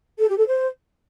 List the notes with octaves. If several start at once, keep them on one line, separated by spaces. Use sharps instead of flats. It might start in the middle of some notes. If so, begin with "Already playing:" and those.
A4
G4
A4
C5